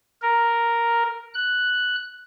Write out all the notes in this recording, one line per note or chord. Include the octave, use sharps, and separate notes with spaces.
A#4
F#6